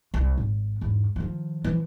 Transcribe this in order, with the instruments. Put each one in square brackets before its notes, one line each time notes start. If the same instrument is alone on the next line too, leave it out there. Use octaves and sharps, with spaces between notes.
[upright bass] C2
G#1
E2 G#2
D#3 F3
E3 F3